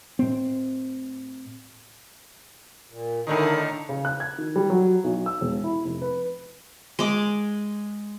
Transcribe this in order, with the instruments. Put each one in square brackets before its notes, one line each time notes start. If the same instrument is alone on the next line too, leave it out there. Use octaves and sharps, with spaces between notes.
[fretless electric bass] A2 C4
[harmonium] A#2
[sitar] A2 D3 D#3 [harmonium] D#4 E4 A#4
[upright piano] C#3
F#6
G#6
D#3
G3
F#3
B1
E6
E1
E4
F1
B4
[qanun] G#3 D6